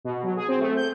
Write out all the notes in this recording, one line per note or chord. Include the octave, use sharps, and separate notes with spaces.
B2
F#3
G#4
C4
A3
G6